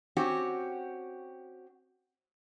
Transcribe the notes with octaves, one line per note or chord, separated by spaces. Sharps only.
C4 C#4 F#4 G4